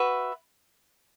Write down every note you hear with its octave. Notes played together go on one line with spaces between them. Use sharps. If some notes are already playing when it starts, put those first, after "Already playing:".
Already playing: F#4 B4 E5